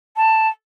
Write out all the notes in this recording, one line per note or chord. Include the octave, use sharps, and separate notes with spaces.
A5